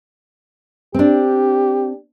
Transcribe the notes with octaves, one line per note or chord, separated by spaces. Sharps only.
C4 D4 G4